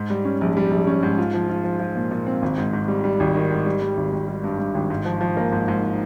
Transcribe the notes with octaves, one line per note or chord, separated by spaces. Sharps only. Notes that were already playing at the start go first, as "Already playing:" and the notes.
Already playing: G#2
G3
C#4
A#1
G3
A#1
C#4
G#2
F4
F3
F4
F3
F3
A#2
A#2
C4
G#1
G#2
G#2
G3
G3
G#1
D#3
G#2
G3
G3
G#1
G#1
G3
G2
G2
G#1
G#2
F3
F3
A#3
G#2
G#2